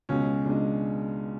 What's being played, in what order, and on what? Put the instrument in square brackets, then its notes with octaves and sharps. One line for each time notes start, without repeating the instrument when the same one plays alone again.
[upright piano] C#2 B2 G#3 C#4
C#2 B2 G#3 D4